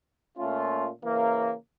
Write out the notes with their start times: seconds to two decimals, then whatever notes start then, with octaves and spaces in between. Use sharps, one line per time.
0.37 A#2 A3 C#4 F4
1.02 C#3 E3 A#3